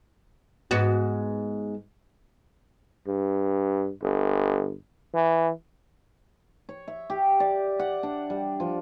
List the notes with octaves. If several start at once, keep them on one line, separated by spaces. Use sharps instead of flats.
G#2 B3 F#4
G2
G1
E3
C#5
E5
G4
D5
F#5
D4
G3
F3